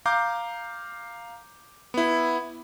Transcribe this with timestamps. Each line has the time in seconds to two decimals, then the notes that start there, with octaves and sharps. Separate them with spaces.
0.06 F5 A#5 D6 G6
1.94 B3 E4